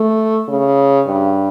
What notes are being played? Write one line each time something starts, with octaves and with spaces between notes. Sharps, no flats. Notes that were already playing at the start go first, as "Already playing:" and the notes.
Already playing: A3
C#3
G2